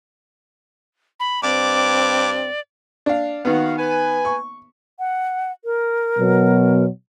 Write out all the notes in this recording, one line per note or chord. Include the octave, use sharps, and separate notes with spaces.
B5
G2 C4 D5 D6
D4 F5
D#3 B3 F#4 F5 F#5
B4 G#5
C#6
F#5
A#4
B2 F#3 B3